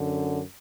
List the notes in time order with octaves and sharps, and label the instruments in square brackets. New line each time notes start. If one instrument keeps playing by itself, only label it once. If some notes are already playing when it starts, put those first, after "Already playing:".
Already playing: [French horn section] F#2 D3